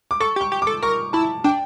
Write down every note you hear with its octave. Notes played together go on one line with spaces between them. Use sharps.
D6
A4 C#6
G4
C#6
G4
A4 D6
A#4 C#6
E4 A5
D4 G5